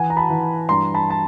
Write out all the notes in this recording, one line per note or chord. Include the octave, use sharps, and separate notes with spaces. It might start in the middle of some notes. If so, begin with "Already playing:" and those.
Already playing: E3 F#5 G#5
A#5
A5 B5
E3
G2 A#5 C6
A5 B5
A5